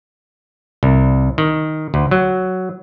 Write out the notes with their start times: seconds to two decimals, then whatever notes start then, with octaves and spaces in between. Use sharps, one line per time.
0.83 C2
1.38 D#3
1.94 D2
2.11 F#3